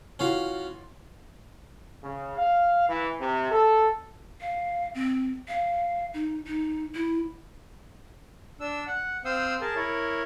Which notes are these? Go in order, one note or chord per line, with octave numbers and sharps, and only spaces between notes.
E3 C#4 F4 F#4 F5
C#3
F5
E3
C3
A4
F5
C4
F5
D#4
D#4
E4
D4 E6
F#5
C4 C5 F5 C6 D#6 E6
G#4 A#4 A5
E4 A#4 C#5